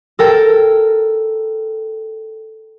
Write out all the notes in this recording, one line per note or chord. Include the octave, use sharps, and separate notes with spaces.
A4 A#4 G5